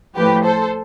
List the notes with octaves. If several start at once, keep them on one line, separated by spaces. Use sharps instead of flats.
A2 F3 G4 B4
A4 C5